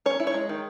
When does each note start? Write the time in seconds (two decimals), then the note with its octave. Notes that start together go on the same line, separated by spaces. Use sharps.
0.06 C#4 C#5
0.20 E4
0.27 C#5
0.34 G#3
0.49 D#3